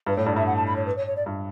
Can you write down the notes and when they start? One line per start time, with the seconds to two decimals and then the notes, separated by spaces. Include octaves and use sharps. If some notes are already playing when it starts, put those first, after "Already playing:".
0.07 G2 B4
0.17 A2 C#5
0.26 G2 D5
0.36 G2 E5
0.47 F#5
0.56 A5
0.67 B5
0.76 C#5
0.86 B4
0.96 C#5
1.07 C#5
1.16 D5
1.26 G2